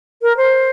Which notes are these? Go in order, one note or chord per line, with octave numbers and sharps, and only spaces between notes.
A#4
C5